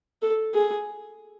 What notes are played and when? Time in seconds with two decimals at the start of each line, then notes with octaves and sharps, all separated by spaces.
0.22 A4
0.54 G#4